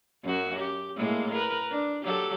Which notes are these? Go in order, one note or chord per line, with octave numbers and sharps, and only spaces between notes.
F#2 C#4 F#4
G4
A2 G#3 A#3
A#4 B4
D4
F#3 G4 A4